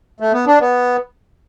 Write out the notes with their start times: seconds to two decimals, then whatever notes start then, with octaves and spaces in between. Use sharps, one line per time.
0.20 A3
0.33 B3
0.47 D4
0.61 B3